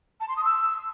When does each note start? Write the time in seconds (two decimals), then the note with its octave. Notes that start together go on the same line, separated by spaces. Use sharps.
0.20 A5
0.29 C6
0.37 D#6
0.45 E6